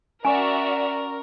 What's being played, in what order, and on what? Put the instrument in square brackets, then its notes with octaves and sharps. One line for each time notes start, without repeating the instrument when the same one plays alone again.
[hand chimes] C#4 C#6 [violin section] F#4 D5 E5 [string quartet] A#4 [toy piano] G#5